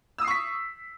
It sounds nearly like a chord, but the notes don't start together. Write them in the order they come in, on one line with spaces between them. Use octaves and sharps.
E6 D#6 C7 C#6 B6